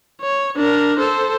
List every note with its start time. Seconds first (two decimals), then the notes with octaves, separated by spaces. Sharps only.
0.21 C#5
0.56 D4 A#4
0.99 A4 C5